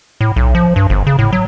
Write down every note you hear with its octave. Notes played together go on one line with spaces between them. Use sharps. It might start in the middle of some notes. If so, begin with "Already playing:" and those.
A2
B1
F3
G2
G1
C#3
A2
F#3